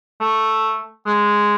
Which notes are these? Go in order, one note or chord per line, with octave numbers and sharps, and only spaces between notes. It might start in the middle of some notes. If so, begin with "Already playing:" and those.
A3
G#3